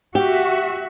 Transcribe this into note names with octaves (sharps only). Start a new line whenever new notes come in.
F#4 G4 E5